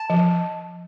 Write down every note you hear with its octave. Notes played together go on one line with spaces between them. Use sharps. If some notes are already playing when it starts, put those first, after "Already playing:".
Already playing: A5
F3